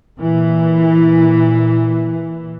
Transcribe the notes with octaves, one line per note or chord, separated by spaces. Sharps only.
A#2 E3